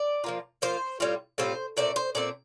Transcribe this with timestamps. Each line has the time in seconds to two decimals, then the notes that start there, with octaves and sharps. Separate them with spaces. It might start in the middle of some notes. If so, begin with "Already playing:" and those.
Already playing: D5
0.24 F3 A#3 F4
0.62 F3 A#3 F4 C5
1.00 A2 G3 C4 F4
1.38 A2 G3 C4 F4 C5
1.77 A#2 A3 C4 D5
1.96 C5
2.15 A#2 A3 C4 D5